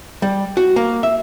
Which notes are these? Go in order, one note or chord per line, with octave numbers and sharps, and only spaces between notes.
G3
F#4
A#3
E5